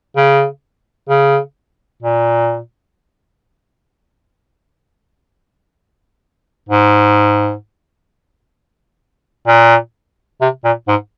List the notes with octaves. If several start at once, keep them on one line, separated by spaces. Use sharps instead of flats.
C#3
C#3
A#2
G#2
A#2
C3
A#2
G#2